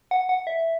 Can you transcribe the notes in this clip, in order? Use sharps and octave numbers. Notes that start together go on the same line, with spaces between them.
F#5
F#5
E5